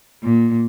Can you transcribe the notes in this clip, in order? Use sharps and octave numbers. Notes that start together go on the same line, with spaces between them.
A#2